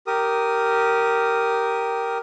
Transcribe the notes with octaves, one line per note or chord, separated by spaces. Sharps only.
G4 A#4 D#6